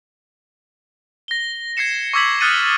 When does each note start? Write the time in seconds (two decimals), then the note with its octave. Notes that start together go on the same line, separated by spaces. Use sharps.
1.28 A#6 G7
1.77 G#6 A#6 C7 C#7 E7
2.14 C#6 D6 E6 G#6 B6 F#7
2.41 D#6 F6 F#6 A6 C#7 D#7